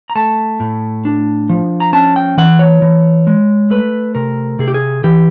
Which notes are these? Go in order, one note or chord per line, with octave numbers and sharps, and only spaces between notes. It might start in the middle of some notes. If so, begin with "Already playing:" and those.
A#5
A3 A5
A2
D4
F3
A#5
C#4 A5
G5
E3 F#5
C#5
E3
G#3
A3 B4
C3 A#4
C3 G#4
G4
G#4
E3 G4